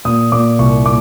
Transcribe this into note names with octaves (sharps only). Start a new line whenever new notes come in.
A#2 D#6
A#2 D6
C2 C#6
A#2 D6